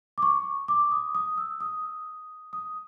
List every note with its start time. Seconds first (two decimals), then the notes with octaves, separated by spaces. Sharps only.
0.18 D6
0.22 C#6
0.68 D6
0.92 D#6
1.15 D#6
1.38 E6
1.60 D#6
2.53 D#6